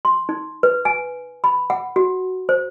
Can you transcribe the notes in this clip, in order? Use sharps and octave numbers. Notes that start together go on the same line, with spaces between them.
C6
D#4
B4
G#5
B5
F#5
F#4
C5